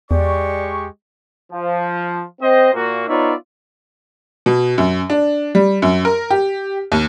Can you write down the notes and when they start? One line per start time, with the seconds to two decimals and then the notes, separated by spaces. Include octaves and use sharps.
0.11 E2 G#3 G4 D5 C#6
1.53 F3
2.41 C4 C5 D#5
2.74 A#2 A#3 F#4
3.08 B3 D#4 F4 C#5 D5 E5
4.46 B2
4.78 F#2
5.10 D4
5.55 G3
5.82 F#2
6.05 A#4
6.31 G4
6.92 D#2